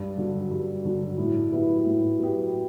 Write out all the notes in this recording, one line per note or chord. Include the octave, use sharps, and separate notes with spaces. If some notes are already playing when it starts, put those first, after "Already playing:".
Already playing: G2
D3 F#3
G2
D3 F#3
A2
F#3 B3 E4 G4
A2
F#3 B3 E4 G4